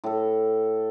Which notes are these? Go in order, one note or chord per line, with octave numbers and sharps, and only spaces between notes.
A2 A4